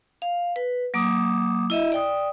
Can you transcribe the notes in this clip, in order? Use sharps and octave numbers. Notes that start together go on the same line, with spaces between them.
F5
B4
F#3 A#3 D6 D#6
E4 D#5 E5
D5 G5 D#6